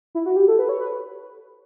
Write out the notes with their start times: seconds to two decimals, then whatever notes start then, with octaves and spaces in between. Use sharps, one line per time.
0.15 E4
0.26 F#4
0.36 G4
0.48 A4
0.59 B4
0.69 C#5
0.80 B4